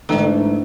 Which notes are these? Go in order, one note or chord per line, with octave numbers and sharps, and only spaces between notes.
G#2 D3 E3 A3